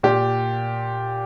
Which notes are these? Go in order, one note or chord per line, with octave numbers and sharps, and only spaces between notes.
A#2 G4